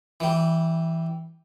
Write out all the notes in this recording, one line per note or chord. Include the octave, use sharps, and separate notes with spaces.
E3 G3